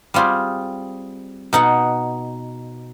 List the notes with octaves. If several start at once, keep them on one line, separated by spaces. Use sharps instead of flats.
G3 C4 F4 G4 G#4
B2 D#4 F#5